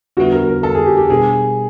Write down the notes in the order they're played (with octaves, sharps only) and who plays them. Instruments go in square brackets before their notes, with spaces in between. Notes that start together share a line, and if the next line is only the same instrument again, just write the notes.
[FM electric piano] D3 G3 B3 E4 [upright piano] F#4
[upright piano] A#4
A#4
A4
G#4
G4
G4
[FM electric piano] B2 G3 B3 D4 [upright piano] G#4